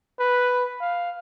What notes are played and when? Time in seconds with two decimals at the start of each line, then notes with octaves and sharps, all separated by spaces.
0.20 B4
0.81 F5